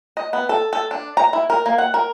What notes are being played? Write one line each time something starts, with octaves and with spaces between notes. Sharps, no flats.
D#5
B3
A4
A4
D4
A#5
E4
A#4
A#3
F#5
A#4